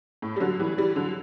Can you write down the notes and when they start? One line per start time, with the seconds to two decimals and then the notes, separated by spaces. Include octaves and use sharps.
0.22 A2
0.36 G3
0.40 D3 F#3
0.59 E3 G3
0.78 E3 G3
0.96 D3 F#3